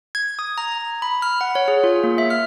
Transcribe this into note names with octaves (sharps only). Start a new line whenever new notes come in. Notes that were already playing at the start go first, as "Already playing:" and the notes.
G#6
D#6
A#5
B5
F6
F#5
C#5
G#4
F4
A#3
E5
F6